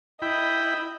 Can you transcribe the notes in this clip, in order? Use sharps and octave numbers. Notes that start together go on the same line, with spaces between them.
E4 D#5 G5 B5